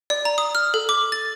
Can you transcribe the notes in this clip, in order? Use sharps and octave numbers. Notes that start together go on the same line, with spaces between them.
D5
A#5
D#6
F6
A4
D6
A6